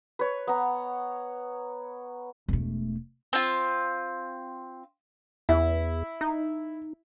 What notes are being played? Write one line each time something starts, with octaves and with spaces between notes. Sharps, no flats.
B4 C#5
B3 A#5
E1 A3
C4 F4
E2 E4
D#4